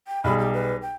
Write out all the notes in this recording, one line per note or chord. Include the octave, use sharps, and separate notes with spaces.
G5
B1 G3 G#4 B5
G4
B4
G5